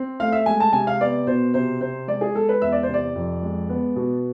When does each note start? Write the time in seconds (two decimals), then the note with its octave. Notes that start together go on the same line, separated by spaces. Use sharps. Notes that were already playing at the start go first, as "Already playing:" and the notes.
Already playing: C4
0.20 A3 F5
0.32 E5
0.46 G#3 G#5
0.60 A5
0.73 C3 G#5
0.87 F5
1.00 B3 D5
1.27 B2 C5
1.54 C3 C5
1.80 C3 C5
2.08 G#3 D5
2.21 G#4
2.35 G#3 A4
2.49 B4
2.62 E2 E5
2.72 D5
2.83 C5
2.89 C3
2.94 D5
3.15 F2
3.43 G#3
3.69 B3
3.96 B2